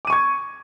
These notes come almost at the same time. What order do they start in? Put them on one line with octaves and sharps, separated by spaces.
D6 D#7 C#6 G#6